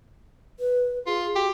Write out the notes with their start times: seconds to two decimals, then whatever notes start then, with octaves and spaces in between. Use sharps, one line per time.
0.60 B4
1.06 F4 G#4
1.35 F#4 G4